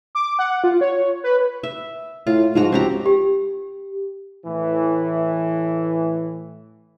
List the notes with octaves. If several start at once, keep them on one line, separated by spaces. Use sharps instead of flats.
D6
F#5
F4
C#5
B4
E5
A2 F4
G#2 F3 F#4 A#5
C#2 C4 G4 A#5
G4
A2 E3